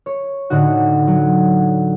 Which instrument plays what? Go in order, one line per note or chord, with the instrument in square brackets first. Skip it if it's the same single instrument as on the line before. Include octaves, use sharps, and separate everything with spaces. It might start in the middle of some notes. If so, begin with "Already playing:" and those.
[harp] C#5
A2 D3 D#4 F#4
F#3